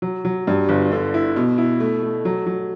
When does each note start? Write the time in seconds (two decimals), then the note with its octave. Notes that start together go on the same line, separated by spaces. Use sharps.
0.02 F#3
0.25 F#3
0.47 G2
0.69 G1
0.92 D3
1.14 E4
1.36 B2
1.58 E4
1.80 A3
2.03 A3
2.25 F#3
2.46 F#3